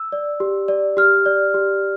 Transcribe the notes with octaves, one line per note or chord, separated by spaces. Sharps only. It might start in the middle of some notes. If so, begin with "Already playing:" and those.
Already playing: E6
D5
G4
D5
G4 F6
D5
G4